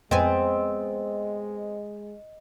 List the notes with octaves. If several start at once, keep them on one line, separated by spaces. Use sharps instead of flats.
F2 G#3 B3 C4 D#5 G#5